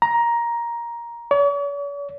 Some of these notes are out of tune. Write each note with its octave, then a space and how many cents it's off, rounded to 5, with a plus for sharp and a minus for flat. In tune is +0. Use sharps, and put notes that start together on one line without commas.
A#5 +10
C#5 +45